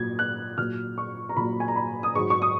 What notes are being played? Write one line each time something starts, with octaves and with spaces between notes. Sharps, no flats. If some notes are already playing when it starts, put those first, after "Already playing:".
Already playing: A#2 F#3 G#6
F#6
A#2 F#3 F6
C#6
A#5
A#2 F#3 B5
G#5
A#5
B5
D#6
G#2 F#3 C#6
C#6
D#6